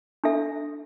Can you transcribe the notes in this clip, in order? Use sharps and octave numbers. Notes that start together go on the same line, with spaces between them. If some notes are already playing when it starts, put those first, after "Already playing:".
D4 A4 E5